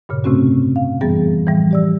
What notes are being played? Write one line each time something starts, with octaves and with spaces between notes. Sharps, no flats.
G2 A#2 C#3
A2 C3 A3 C4 C#4 F#4
F5
F#2 E3 G3 B3 G#4 A6
A2 E3 F3 G3
G4 D5 E6